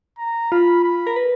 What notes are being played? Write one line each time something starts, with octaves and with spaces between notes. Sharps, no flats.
A#5
F4 B5
B5
A#4
B4